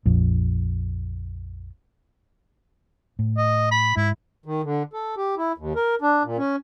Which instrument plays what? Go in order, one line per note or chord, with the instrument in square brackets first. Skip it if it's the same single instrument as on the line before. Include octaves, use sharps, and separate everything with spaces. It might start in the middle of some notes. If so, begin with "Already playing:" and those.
[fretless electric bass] A#1 F2
[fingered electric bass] A2
[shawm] D#5
B5
[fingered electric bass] G#2 [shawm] E4
[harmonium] D#3
D3
A4
G4
E4
D#2
A#4
D4
A#2
C#4